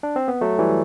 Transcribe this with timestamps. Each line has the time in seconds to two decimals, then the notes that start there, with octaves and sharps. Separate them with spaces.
0.03 D4
0.16 C4
0.28 B3
0.41 F#3 A3
0.58 E3 G3